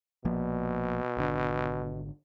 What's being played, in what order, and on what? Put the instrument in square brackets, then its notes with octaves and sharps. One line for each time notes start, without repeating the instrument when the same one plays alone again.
[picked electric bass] A#1 F3 A#3 [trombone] B2
[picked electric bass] G#1 D3